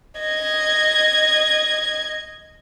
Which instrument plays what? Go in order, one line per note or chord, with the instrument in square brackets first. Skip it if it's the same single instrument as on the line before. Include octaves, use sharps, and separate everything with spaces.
[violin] D#5 G#6